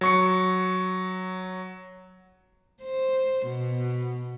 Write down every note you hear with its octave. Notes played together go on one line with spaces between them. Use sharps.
F#3 C#6 C#7
C5
B2